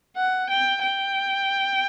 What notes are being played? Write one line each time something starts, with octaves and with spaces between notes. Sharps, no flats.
F#5
G5
G5